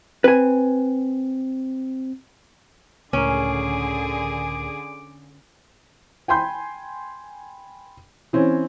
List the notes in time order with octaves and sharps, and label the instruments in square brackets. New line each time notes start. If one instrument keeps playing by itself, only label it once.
[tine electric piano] C4 [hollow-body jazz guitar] B4 G#5
[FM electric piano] C#2 A2 A#4 [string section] D3 G#4 [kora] C#4 [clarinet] D6
[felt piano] G5 G#5 B5 C6 G6
E3 C4 C#4